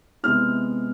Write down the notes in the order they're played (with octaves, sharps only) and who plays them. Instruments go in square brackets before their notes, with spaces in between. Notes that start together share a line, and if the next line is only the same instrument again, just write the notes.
[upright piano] C3 G#3 B3 E4 F6